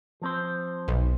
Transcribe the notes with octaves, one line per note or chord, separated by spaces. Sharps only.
F3 C4 C5
B1